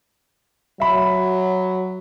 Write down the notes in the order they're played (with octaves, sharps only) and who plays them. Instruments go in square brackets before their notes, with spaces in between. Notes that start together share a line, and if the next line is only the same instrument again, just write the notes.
[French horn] F#3 [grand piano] E5 B5